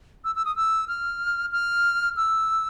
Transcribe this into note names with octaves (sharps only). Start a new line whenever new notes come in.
E6
E6
D#6
E6
F6
F6
E6